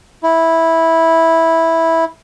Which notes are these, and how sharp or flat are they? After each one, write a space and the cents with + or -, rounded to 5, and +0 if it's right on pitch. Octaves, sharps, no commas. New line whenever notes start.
E4 -10